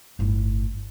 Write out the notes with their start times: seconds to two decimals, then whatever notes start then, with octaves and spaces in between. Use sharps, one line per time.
0.19 G1 A2